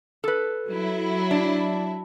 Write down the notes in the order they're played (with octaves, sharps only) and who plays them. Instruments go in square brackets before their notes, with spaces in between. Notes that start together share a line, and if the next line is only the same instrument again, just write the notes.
[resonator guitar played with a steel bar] A4 B4
[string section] F#3 E4
[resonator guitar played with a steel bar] D4